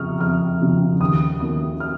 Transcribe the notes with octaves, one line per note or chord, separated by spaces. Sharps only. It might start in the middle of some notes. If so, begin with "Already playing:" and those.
Already playing: F2 C#3 F3 A#5 C#6 D#6 F6
F2 F6
C#3 F3
D#2 D#6
D#3 F#3 A#3 C#4 D#6
F6